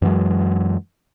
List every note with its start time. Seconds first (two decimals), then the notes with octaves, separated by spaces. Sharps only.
0.02 F#2 E3 F#3 G#3